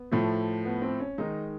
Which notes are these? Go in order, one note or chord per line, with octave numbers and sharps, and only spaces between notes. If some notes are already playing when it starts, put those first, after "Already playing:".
Already playing: B3
A2 F3 A3
B3
C4
C#4
D#3 G#3 D#4